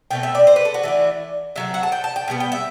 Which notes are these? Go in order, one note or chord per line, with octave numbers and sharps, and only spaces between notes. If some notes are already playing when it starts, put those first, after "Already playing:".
B2 A3 C4 G5
E5
D5
C5
B4
A4
F#4
E3 A3 D4
C3 F#3 A3 E5
F#5
A5
G5
A5
G5
B2 G3 B3
G5
E5